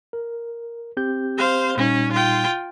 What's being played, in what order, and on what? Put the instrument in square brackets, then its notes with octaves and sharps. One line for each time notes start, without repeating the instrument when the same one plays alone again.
[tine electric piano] A#4
C4 G4 G6
[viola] C5 F5
[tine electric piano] A#2 G3 D#4 [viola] C#4
[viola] F4 G5